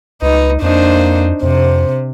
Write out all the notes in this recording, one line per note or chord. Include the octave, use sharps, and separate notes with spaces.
C#2 D#4 B4
F2 A#3 D4 D#4 C5
F2 C3 C5